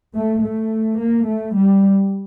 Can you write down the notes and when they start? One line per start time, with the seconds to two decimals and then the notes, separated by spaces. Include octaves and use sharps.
0.14 A3
0.41 A3
0.98 A#3
1.26 A3
1.55 G3